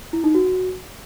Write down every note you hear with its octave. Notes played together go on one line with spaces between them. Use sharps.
E4
D#4
F#4